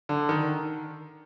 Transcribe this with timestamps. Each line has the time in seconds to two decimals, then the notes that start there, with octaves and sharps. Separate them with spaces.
0.09 D3
0.29 D#3